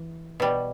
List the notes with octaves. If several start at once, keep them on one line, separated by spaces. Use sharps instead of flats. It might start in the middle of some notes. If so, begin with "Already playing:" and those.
Already playing: E3
B2 G3